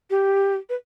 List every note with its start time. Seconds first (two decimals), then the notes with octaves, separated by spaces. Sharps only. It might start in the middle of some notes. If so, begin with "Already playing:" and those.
0.10 G4
0.69 B4